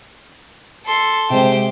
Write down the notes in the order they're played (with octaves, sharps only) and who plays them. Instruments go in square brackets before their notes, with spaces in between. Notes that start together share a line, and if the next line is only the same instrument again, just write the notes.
[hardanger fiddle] A4 C6
[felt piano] C3 G#3 [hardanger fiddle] G4 C5